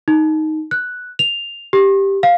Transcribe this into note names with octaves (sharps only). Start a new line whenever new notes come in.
D#4
F#6
F7
G4
F5